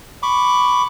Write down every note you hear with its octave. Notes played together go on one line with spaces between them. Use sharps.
B5 C#6 D6